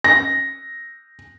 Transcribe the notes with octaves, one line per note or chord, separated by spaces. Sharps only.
A#6